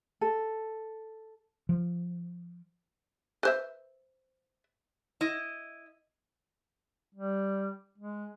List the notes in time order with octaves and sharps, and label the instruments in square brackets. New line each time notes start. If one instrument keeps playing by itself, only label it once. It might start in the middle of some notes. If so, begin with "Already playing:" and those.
[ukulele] A4
[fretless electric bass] F3
[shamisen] B4 C5 E5
[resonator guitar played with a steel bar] E4 D#5
[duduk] G3
G#3